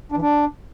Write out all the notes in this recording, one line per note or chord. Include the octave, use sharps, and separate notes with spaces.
D4
E3
D4